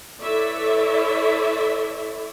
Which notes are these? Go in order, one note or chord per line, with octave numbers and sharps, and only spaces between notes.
E4 A4 B4 C#5 D5 E5